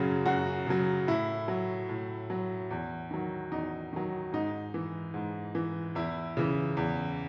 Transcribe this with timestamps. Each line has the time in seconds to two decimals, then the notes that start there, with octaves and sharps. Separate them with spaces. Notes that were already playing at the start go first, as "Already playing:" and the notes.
Already playing: F#2 C#3 F#3 G#4
0.26 F#2 F#4
0.67 C#3 F#3
1.08 A2 E4
1.48 F#3
1.89 A2
2.30 F#3
2.71 E2
3.11 D#3 F#3
3.52 E2 D#4
3.93 D#3 F#3
4.33 G#2 D#4
4.74 E3
5.14 G#2
5.55 E3
5.95 E2 E4
6.37 C#3 E3
6.77 E2